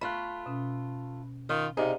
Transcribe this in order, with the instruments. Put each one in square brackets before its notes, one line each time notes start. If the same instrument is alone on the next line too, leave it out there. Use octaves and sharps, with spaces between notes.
[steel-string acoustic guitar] A3 F4 [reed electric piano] B5 F#6
[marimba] B2 C#4
[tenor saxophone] D#3 [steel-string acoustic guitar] F4
[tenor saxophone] C3 [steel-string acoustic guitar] D#4 [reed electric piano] G#4 D5 F5